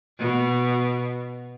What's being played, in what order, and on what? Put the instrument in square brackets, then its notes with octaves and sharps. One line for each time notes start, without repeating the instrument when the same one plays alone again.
[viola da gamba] B2